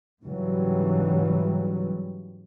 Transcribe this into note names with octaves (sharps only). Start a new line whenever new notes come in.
G#2 C#3 E3 F#3 G3